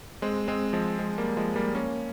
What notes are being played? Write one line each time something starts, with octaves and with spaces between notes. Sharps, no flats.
G#3 C4
G#3 C4
F3 G#3
G#3 C4
G3 A#3
F3 G#3
G3 A#3
A#3 C#4